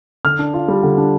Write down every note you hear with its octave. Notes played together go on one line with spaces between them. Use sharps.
D3 F6
D4
F4
G3
D3
D4